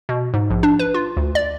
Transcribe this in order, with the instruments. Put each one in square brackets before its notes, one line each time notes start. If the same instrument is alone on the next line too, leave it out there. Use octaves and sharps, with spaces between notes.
[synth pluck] B2
G#2
A#1
D4
B4
F4
D2
D5